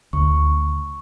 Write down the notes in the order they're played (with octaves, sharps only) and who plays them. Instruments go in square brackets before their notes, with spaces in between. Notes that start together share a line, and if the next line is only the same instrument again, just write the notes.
[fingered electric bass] D2 [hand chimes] C#6